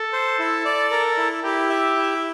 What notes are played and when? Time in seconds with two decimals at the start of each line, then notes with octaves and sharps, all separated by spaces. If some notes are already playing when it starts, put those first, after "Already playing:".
Already playing: A4
0.13 C5
0.39 E4
0.65 D5
0.91 A#4
1.18 E4
1.43 E4 G4
1.70 E5
1.96 E4